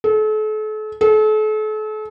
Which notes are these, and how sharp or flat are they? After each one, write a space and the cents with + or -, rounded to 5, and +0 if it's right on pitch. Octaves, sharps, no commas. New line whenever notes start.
A4 -40
A4 -40